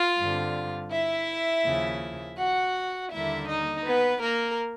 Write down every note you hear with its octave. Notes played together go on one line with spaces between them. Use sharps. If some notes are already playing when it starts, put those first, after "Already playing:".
Already playing: F4 F5
G2 D3 G3 C4
E4 E5
D#2 C#3 F3
F#4 F#5
D#2 D3 G3 A#3 E4 E5
D#4 D#5
B3 B4
A#3 A#4